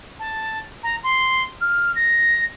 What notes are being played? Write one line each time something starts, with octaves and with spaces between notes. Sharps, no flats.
A5
A#5
C6
F6
A#6